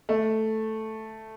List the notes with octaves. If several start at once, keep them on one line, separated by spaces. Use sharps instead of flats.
A3